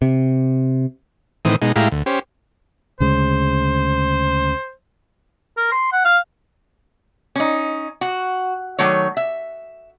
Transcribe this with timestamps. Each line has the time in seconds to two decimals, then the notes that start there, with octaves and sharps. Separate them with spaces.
0.02 C3
1.45 A2 D#3 E3 C4 D#6
1.62 B2 G#3 D#4
1.76 A2 G#3 E4 G4 F5 A#5
1.92 D2
2.06 C#4 G4 C5
3.00 D2 C#3 G#3 C5
5.57 A#4
5.72 C6
5.93 F#5
6.05 F5
7.36 C#4 D#4
8.01 F#4
8.79 D#3 F#3 A3 C#5
9.17 E5